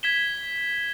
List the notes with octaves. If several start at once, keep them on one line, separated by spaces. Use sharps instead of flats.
G#6 B6 E7 G7